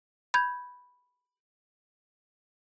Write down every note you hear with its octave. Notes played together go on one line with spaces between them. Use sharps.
B5 G6 G#6